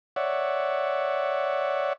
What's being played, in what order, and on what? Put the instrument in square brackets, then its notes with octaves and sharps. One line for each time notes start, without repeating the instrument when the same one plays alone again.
[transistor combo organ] C#5 D5 E5 F#5